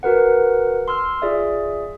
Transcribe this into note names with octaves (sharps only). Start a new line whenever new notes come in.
F#4 A#4 B4 F#5
C6 E6 F6
F4 G#4 D5 E5